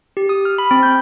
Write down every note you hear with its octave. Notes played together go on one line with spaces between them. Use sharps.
G4
D#6
F6
B5
C4
G6